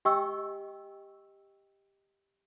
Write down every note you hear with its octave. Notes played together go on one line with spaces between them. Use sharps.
G4 D#5 G5 G#5 C#6 E6